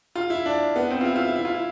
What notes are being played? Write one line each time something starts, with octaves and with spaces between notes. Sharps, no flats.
F4
E4
D4
B3
C4
F4
E4
F4
E4
E4
F4
E4